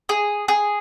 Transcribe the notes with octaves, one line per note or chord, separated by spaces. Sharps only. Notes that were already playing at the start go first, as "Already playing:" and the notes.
G#4
G#4